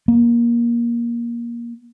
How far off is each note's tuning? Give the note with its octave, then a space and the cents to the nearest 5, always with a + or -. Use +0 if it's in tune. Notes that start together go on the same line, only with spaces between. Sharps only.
A#3 +20